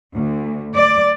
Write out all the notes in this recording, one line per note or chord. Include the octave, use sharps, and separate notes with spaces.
D2
D5